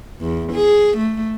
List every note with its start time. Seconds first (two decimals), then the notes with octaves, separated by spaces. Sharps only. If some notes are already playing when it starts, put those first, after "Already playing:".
0.21 E2
0.52 G#4
0.97 A3